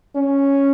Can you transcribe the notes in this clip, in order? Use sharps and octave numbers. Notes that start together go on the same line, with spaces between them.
C#4